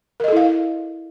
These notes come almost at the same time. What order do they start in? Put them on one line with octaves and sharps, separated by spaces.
A#4 D#5 A4 E4 F5